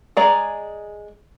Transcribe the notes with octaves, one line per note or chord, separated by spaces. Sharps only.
G#3 G#4 D5 A#5